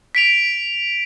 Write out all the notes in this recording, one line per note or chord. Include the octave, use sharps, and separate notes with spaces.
B6 D7 F7